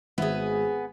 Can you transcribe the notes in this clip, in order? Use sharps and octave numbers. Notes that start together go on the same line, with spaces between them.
G#1 B3 G#4 E5